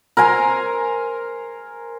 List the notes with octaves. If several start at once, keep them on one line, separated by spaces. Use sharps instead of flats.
A#4 C5 G#5 A#5